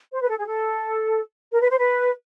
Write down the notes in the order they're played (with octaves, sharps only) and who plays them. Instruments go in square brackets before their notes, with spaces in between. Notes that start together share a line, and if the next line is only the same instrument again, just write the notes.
[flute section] C5
B4
A4
G#4
A4
A#4
B4
C5
B4